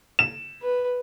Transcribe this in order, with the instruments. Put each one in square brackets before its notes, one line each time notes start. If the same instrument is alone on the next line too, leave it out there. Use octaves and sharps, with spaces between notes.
[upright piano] E7
[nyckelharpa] B4